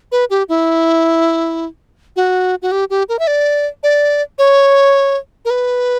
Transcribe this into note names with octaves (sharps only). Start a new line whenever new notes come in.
B4
G4
E4
F#4
F#4
G4
G4
A#4
E5
D5
D5
C#5
A#4
B4